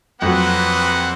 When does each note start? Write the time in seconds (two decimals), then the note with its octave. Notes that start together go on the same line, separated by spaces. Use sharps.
0.22 F2 F#3 A#3 C4 B4 F#5